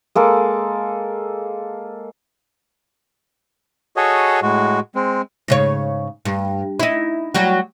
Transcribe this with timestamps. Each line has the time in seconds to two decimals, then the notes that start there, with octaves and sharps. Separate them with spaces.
0.15 G#3 A#3 A4
3.97 F#4 G#4 A4 C#5 D#5
4.43 A2 G#3 F#4
4.95 G#3 C4
5.48 G#2 C#3 C#5
6.25 G2
6.80 D#4 E4
7.35 F#3 G3 F#4